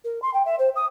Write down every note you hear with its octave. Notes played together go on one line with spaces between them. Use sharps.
A#4
C6
G5
E5
C5
D#6